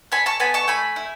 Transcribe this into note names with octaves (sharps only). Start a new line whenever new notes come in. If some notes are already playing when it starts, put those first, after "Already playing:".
A4 G#5 B5
A5 C#6
B3 G#5 B5
A5 C#6
A3 G#5 B5
E4